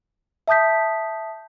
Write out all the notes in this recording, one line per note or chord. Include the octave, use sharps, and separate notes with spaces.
E5 A5 D#6 G6 B6